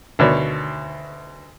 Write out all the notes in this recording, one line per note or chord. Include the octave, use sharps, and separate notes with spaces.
D2 B2 D#3 C#5 D5